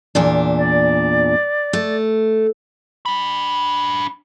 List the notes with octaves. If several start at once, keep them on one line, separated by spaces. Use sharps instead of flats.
E2 A#2 D4
D5
A3
D4 B5